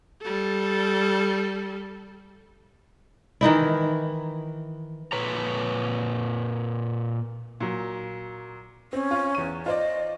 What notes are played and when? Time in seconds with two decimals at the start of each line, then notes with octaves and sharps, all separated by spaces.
0.22 G3 A4
3.41 D#3 E3 D#4 E4
5.12 A#2 B4 C#5 A#5
7.60 A#2 F#3
8.93 C4 C#4
9.11 F4
9.35 E2 D#7
9.66 F4 C5 D5 D#5